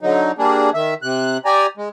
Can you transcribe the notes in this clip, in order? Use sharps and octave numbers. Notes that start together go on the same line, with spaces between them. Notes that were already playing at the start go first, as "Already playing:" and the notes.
D3 F#3 D#4
G3 A#3 D4 G#4
D#3 E5
C3 F#6
G4 D5 G#5 A#5
G#3